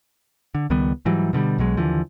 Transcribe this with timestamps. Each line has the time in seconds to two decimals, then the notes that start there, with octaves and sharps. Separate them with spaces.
0.55 D3
0.70 C#2 D#3 G3 B3
1.05 G#2 E3 F#3 G3
1.33 B2 D3 F3 G3
1.58 B1 B2 F#3 G#3
1.77 D#2 D3 E3 F3